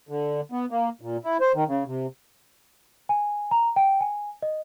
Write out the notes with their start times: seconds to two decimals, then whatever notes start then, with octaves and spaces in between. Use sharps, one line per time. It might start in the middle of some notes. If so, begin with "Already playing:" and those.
0.09 D3
0.52 B3
0.71 A#3
1.01 A#2
1.24 E4
1.41 C5
1.55 D#3
1.68 C#3
1.86 C3
3.09 G#5
3.51 A#5
3.76 G5
4.01 G#5
4.43 D#5